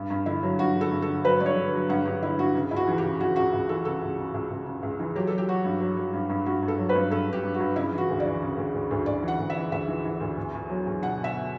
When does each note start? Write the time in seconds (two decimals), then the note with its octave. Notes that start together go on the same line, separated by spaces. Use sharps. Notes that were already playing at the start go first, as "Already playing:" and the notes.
Already playing: G2
0.10 G2
0.26 D3 E4
0.43 F#3
0.59 G2 F#4
0.75 D3
0.81 A4
0.91 G2
1.02 A4
1.08 D3
1.24 F#3 B4
1.40 G2 D5
1.46 C#5
1.57 D3
1.73 F#3
1.89 G2 F#5
2.05 G2 G4
2.22 D3 E4
2.38 G2 F#4
2.55 C#3
2.71 C#2 E4
2.76 F#4
2.87 E3
2.98 G4
3.04 C#3
3.20 E3 F#4
3.36 C#2 F#4
3.53 C#2
3.69 E3 A4
3.85 C#3 A4
4.02 C#2
4.18 C#3
4.34 C#2
4.50 C#2
4.66 C#3
4.83 C#2
4.99 E3
5.15 F#3 G4
5.27 F#3 A4
5.38 G4
5.48 F#3 F#4
5.64 G2
5.80 F#3
5.97 F#3
6.13 G2
6.30 G2
6.46 G2 F#4
6.63 G2
6.68 A4
6.78 F#3
6.89 B4
6.95 G2
7.11 G2 A4
7.27 G2
7.33 G4
7.43 G2
7.54 F#4
7.60 G2
7.76 C#3 E4
7.92 E3
7.98 F#4
8.09 D2
8.20 D5
8.26 E3
8.42 C#3
8.58 D2
8.74 D2
8.91 D2
9.06 D2 D5
9.23 E3
9.28 F#5
9.39 D2
9.50 E5
9.56 E3
9.72 D2 E5
9.88 E3
10.04 E3
10.21 D2
10.37 E2
10.54 E2
10.70 F#3
10.86 E2
11.02 B2 F#5
11.18 B2
11.24 E5